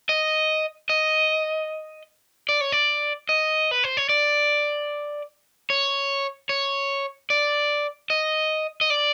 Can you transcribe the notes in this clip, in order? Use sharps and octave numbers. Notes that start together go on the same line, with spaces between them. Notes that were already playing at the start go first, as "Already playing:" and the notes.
D#5
D#5
D5
C#5
D5
D#5
B4
C5
C#5
D5
C#5
C#5
D5
D#5
D#5
D5